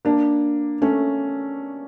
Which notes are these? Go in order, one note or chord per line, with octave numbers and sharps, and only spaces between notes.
A#3 D4
A3 C#4